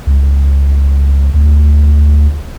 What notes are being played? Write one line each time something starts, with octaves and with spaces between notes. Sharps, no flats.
C#2
D2